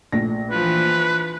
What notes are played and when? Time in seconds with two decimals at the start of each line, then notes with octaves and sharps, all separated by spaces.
0.12 A#1 A3 A#6
0.51 E3 F3 B4